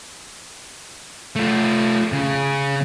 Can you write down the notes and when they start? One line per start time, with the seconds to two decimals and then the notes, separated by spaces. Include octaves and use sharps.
1.36 A3 F4
2.12 C#3